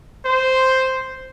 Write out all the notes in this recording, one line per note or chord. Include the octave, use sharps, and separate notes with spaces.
C5